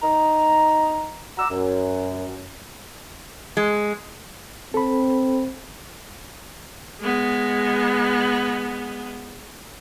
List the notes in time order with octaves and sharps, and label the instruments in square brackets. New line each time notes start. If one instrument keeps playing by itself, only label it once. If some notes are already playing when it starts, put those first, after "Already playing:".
[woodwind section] D#4 A#5
F#5 A#5 D6 E6
F#2
[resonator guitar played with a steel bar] G#3
[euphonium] C4 [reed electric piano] A4 B5
[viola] G#3 B3